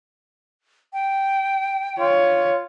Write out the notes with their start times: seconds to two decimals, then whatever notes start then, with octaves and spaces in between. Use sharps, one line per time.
0.93 G5
1.99 F4 C#5